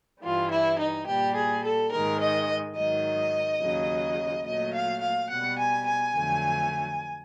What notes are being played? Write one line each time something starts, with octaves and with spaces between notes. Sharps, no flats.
G2 E3 G3 F4
E4
D#4
A#2 G3 G4
G#4
A4
G#2 D#3 G#3 A#4
D#5
G#2 D#3 F#3 D#5
D#2 C#3 F#3
A#2 F#3 A3 D#5
F5
F5
B2 G3 F#5
G#5
G#5
F2 D3 F#3 A3